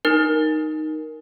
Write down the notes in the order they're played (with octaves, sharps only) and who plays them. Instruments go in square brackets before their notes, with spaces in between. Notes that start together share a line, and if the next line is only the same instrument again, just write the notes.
[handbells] D#4 A#4